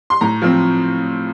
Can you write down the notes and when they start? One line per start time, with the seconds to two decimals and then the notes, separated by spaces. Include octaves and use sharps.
0.10 C6
0.21 A2 A#5
0.42 F3 C4